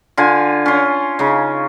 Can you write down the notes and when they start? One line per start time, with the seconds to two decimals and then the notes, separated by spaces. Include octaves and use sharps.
0.17 D3 F4 G#5
0.66 C#4 C6
1.19 C#3 D#4